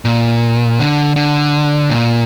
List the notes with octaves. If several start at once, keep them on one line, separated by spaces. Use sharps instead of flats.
A#2
D3
D3
A#2